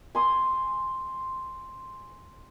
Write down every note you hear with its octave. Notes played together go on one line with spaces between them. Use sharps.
G#5 C6 D#6